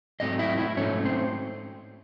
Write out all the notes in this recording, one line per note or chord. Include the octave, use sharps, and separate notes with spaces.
G#2 F#3 A3 C4 D#4 D#5
E4 E5
E4 E5
G#2 F#3 A3 C#4 D#4 C#5
C4 C5